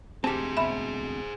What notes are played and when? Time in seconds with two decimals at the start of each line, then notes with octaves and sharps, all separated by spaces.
0.24 E1 D2 C4 G4 G#4 C5 A5
0.57 B2 E5 B5